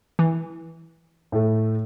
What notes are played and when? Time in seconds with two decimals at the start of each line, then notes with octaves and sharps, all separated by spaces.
0.19 E3
1.32 A2 A3